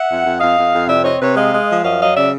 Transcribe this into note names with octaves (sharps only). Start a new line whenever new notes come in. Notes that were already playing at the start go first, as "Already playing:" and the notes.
Already playing: E5 F#5
F2
F2
F2 D#5 F5
F2
F2
C3 D5 E5
C4 C#5 D#5
C3 B4 C#5
G#3 D#5 F5
G#3
F3
F#2 D#5 F5
F#3 D#5 F5
C#3 D5 E5